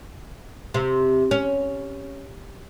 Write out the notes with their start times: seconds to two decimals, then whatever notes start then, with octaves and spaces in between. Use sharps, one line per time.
0.74 C3
1.31 C#4